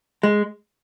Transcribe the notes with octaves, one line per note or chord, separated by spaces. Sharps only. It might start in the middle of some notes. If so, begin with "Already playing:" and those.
G#3